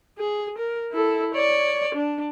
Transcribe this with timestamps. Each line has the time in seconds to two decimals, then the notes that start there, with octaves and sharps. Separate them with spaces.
0.18 G#4
0.58 A#4
0.92 E4 A4
1.35 C#5 D5
1.94 D4